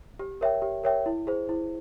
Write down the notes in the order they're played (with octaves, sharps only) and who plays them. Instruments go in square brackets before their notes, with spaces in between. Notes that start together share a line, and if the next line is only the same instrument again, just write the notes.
[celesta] G4
A#4 C#5 E5 G5
G4
A#4 C#5 E5 G5
E4
G#4 C5
E4